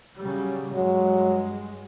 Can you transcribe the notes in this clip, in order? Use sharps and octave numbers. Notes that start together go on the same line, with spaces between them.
C#3 F#3 G3
G2 F#3 G#3